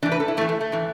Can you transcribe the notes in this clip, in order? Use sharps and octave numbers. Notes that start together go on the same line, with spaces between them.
A2 E3 D4
B4
A4
E4
A2 E3 A3
A3
A3
A2 E3